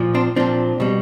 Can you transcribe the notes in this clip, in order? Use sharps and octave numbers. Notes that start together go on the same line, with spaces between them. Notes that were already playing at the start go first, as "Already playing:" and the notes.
Already playing: A#2 F3
C4 D4
A#2 F3 C4 D4
B2 G3